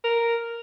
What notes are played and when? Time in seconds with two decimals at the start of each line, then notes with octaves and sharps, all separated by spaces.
0.04 A#4